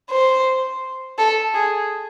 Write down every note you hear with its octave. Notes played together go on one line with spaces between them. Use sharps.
C5
A4
G#4